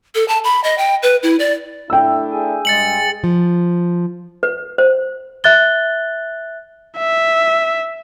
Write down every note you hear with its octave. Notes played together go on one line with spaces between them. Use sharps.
A4
A5
B5
D#5
G5
B4
E4
D5
A3 D4 E4 G5 E6
G#4 G#5
G2 G#3 A6 C#7 F#7
F3
B4
C5
E5 F#6 A6 G7
E5